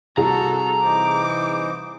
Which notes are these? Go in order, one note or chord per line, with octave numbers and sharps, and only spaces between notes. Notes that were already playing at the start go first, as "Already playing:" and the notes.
C2 F#4 G#4 A4 A#5
E3 D#4 C5 D6